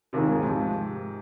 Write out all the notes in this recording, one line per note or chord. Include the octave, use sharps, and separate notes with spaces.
D#2 C3 D#3 C4 F4 G#4
G#2
G#2 C3 F3 C4